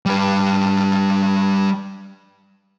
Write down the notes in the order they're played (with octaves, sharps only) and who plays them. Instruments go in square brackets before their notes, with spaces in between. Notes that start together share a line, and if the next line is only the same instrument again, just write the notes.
[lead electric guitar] G3 B4